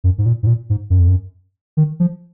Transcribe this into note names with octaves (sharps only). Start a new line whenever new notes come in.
F#2
G#2
A#2
G#2
A#2
G#2
F#2
F2
F#2
D#3
F3